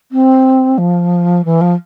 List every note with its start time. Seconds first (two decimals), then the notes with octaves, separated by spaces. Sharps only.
0.12 C4
0.78 F3
1.45 E3
1.61 F3